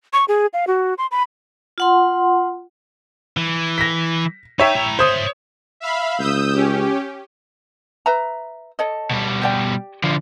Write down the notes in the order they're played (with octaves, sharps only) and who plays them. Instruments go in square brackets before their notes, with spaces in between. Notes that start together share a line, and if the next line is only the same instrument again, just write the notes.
[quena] C#6
G#4
F5
F#4
C6
B5
[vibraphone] F4 F#5 C6
[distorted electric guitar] E3
[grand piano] A#6 B6
[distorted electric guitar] D#4 [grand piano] C#5 E5 G5
[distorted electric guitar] E4 A#5
[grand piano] C5 D#6 [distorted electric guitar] C#5 E5
[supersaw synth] E5 F5 B5
[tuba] C#2 [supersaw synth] D#6 E6 G6
[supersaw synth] C#4 G4
[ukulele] B4 E5 A#5
A4 C#5 D#5
[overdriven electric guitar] B2 G3
[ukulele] G4 D5 G5
[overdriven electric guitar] D3 F3